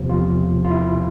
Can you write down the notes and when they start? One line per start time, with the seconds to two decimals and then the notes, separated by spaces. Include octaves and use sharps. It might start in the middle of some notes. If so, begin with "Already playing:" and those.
Already playing: E2 C3 F3
0.10 F4
0.65 F4
0.70 E4